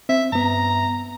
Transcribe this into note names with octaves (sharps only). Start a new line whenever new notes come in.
C4 E5
G2 B3 A#5